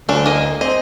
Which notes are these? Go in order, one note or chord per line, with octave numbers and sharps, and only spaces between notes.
D2 C#4 D4
A#3 D#5
C4 D#5